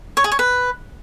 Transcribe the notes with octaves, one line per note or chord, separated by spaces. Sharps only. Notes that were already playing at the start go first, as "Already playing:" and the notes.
C#5
G#4
C#5
B4